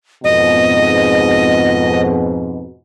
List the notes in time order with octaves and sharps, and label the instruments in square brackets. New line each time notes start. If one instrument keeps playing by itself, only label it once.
[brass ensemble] F2 G#2 B2 [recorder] D#5